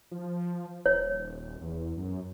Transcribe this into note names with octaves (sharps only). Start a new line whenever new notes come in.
F3
D#1 C#5
E2
F#2